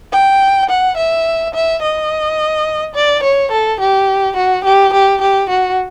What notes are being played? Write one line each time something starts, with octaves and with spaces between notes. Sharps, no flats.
G5
F#5
E5
E5
D#5
D5
C#5
A4
G4
F#4
G4
G4
G4
F#4